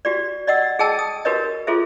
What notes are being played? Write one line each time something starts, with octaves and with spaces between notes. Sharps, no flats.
F#4 G4 D5
D5 D#5 F#5 E6
G#4 D#5 G5 A5 E6
D#6
F#4 G4 A#4 B4 C#5 D#5
F4 F#4 G#4 A4 C5 E5